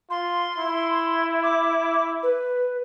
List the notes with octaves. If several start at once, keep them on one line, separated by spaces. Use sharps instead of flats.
F4 C6
E4
D6
B4